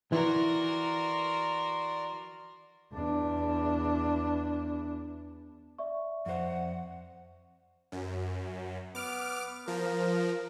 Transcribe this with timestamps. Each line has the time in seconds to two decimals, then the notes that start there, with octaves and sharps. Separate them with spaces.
0.12 E3 F#4 A#4 D5 C6
2.93 E2 D4
5.78 D5 E5 C#6
6.26 F2 C5 F#5
7.92 F#2
8.95 B3 D6 F6
9.68 F3 A#4